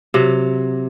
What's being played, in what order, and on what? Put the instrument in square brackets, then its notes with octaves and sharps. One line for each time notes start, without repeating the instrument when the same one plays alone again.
[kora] C3 F#3